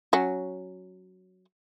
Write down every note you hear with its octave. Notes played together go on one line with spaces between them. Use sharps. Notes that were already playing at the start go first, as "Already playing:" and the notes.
F#3 C#4